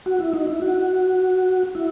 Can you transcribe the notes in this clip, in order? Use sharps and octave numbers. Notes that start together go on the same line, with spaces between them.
F#4
E4
D#4
E4
F#4
E4